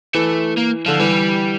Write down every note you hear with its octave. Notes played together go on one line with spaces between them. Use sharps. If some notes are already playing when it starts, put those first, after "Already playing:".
E3 A3
A#3
D3 F3
E3 G3